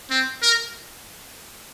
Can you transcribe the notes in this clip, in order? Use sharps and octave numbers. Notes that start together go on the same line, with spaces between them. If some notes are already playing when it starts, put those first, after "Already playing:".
C4
A#4